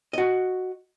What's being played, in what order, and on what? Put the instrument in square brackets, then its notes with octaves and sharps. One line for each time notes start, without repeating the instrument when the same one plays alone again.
[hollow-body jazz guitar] F#4 D#5